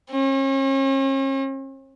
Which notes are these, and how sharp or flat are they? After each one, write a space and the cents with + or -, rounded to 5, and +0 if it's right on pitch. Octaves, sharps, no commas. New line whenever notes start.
C#4 -40